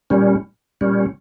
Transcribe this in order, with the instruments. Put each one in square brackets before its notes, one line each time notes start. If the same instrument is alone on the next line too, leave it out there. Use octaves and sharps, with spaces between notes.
[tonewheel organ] A#2 G3 C#4
A#2 G3 C#4